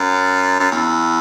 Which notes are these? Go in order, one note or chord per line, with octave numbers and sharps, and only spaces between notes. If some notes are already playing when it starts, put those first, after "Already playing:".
Already playing: F#2
F#2
E2